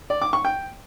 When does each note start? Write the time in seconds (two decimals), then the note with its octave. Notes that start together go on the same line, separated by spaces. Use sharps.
0.10 D5
0.22 D6
0.33 C#6
0.45 G5